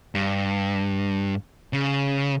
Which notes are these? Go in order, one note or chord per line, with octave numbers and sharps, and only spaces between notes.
G2
C#3